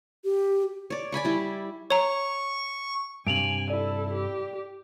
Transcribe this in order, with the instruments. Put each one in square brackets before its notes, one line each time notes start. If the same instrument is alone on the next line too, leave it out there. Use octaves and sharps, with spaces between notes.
[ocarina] G4
[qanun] C#5 D5
D5 G#5 B5 C#6
G3 E4
[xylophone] C#5 A#5 [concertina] C#6
[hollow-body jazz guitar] G2 C3 [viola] G#5 [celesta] D7 F7 F#7
[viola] E4 A4 [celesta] D5
[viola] G4